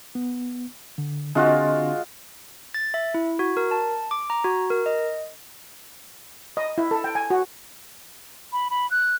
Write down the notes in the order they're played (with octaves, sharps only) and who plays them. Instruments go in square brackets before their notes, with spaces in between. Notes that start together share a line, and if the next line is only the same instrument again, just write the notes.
[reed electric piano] B3
D3
[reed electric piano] D3 C4 D4 [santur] G#3 F4 F#4
[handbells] A6
E5
E4
F#4
A#4
A5
D6
A#5
F#4
A#4
D#5
[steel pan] D#5
E4
A4
G5
G#5
F#4
[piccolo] B5
B5
F#6